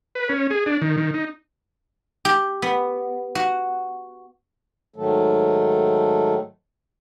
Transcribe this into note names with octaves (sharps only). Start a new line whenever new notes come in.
B4
C#4
G#4
D4
D#3
D#3
D#4
G4
B3
F#4
G#2 D#3 F#3 A3 A4